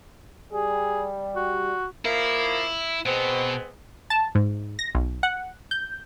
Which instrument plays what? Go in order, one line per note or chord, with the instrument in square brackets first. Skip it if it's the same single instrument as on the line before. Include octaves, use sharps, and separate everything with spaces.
[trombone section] G3 [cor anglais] G#4
[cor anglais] F#4
[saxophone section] F3 A#3 [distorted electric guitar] E4
[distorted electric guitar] B2 [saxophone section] G#3 B3 C4
[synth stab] A5
G#2
A#6
B1
F#5
G6